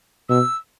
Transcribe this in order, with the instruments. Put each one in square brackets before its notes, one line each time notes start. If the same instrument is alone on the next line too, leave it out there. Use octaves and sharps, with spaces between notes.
[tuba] B2 [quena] E6